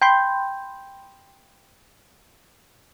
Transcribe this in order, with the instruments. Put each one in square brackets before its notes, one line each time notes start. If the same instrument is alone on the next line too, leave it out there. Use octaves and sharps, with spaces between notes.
[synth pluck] G5 B5 C6 G6